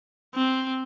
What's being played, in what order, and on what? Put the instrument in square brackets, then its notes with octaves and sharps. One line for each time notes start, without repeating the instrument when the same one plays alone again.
[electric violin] C4